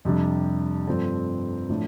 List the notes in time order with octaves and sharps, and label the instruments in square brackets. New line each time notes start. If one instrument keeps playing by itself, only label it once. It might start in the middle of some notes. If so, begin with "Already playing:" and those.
[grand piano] F2 C3 G3 D4
G2 F3 A3 C4
A2 F3 A3 D4